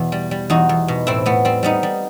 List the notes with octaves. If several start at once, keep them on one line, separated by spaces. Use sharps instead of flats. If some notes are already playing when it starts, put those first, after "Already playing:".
Already playing: E2 B2
G3
G3
E2 D#4 F#4
E2
B2
A2 C4 E4
A2 B3
G3 C4
G3 B3 D#4
G3